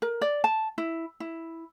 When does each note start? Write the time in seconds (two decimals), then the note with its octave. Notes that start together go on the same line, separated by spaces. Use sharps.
0.02 A#4
0.21 D5
0.44 A5
0.78 E4
1.20 E4